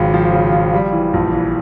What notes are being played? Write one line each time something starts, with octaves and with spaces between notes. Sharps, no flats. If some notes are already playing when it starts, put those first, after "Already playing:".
Already playing: G#1 C#3 F3
F3
C#3
F3
G3
E3
A#1
E3